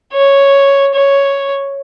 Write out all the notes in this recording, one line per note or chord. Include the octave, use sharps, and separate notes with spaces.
C#5
C#5